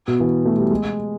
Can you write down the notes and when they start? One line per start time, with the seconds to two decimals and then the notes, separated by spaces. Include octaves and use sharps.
0.08 B2
0.20 E3
0.45 A3
0.58 G3
0.71 G#3